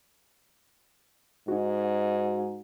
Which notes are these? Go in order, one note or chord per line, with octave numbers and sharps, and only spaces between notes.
G#2 D#4 F#4